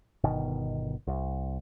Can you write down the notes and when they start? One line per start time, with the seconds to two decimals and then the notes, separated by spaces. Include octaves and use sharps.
0.24 G1 B2 D#3
1.07 C2